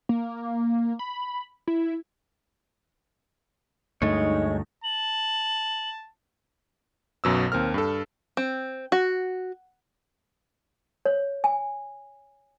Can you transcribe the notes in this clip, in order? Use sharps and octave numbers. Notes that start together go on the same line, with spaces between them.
A#3
B5
E4
D2 G2 G#3 A3 D#4 C#5 D#5
A5 F#7
B1 F#2 B2 E6
D#2 C4 A#4 F6
G2 A4
C4
F#4
C#5
G#5